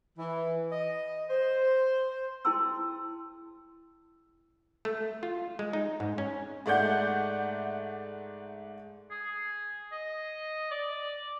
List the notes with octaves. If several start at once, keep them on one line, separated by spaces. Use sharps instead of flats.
E3
D#5
C5
E4 G#4 G5 A5 C6 E6
A3
F4
G#3
D#4
G#2
C#4
G#2 A3 D5 F#5 G6
G#4
D#5
D5